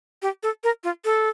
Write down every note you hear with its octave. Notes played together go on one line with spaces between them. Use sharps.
G4
A4
A#4
F4
A4